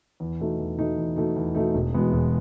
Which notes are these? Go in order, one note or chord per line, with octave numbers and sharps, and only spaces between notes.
E2
B2 A3 D#4
E2
B2 A3 D#4
E2
B2 A3 D#4
E2
B2 A3 D#4
E1
E2 B2 G#3 B3
E1